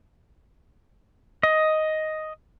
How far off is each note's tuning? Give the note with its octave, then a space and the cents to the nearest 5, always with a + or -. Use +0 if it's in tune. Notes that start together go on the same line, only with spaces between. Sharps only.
D#5 +5